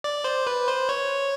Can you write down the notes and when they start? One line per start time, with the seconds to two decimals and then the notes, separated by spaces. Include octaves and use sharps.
0.04 D5
0.24 C5
0.47 B4
0.68 C5
0.89 C#5